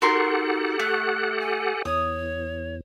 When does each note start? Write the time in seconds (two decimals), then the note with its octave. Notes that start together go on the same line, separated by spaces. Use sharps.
0.02 D#4 F#4 G4 A4 A#4 F#5 C6
0.80 A3 F#6
1.40 G#5
1.85 E2 C#5 D#6